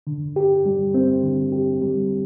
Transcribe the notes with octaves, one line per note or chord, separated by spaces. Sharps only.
D3
G4
G3
C4
D3
G4
G3